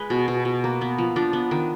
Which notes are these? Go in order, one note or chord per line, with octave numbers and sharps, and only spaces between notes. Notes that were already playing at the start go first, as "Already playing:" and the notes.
Already playing: G#3 B4
B2
B2
B2
A#3
B3
F3
F3 D4
B3
D#3